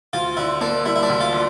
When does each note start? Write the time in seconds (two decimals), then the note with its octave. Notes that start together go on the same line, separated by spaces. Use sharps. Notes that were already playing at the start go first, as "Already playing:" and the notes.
0.13 D2 F4
0.37 D3 E4
0.61 A#3 D4
0.85 G3 E4
0.96 E4
1.03 D4
1.09 D2
1.21 F4
1.32 D3